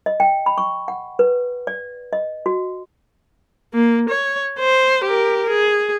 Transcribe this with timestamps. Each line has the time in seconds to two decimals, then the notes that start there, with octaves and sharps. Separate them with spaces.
0.06 D#5
0.20 G5
0.46 B5
0.58 C#6
0.88 F#5
1.19 B4
1.67 D5
2.13 D#5
2.46 F#4
3.74 A#3
4.09 C#5
4.59 C5
5.04 G4 A#4
5.50 G#4